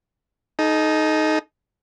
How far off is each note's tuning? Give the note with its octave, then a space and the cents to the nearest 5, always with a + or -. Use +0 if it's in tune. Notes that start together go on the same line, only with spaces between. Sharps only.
D#4 +0 A4 -40